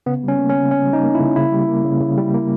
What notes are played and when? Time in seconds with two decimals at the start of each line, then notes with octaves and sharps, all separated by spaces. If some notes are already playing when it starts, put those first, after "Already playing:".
0.06 C#3 B3
0.24 G3 C#4
0.39 A#3
0.50 C#4
0.55 C#3
0.71 C#3 C#4
0.87 G3
0.93 D#4
1.04 A#3
1.15 E4
1.20 C#3
1.36 C#3 E4
1.52 G3
1.69 A#3
1.85 C#3
2.01 C#3
2.18 G3
2.34 A#3